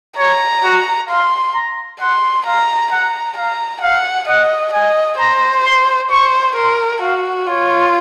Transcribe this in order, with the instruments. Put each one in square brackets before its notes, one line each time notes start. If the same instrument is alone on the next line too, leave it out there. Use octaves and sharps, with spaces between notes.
[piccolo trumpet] C#5 [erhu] A#5
[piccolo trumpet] F#4
[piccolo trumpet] F5 [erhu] C6
[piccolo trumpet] A#5
[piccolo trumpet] F#5 [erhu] C6
[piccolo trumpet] F5 [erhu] A#5
[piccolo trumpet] F#5 [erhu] A#5
[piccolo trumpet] F5 [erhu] A#5
[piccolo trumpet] F5 [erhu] F#5
[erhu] D#5 [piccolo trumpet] F#5
[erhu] D#5 [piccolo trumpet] G#5
[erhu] C5 [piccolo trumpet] A#5
[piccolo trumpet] C6
[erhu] C5 [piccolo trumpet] C#6
[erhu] A#4 [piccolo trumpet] C6
[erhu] F#4 [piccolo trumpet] F5
[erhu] F4 [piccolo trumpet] C#5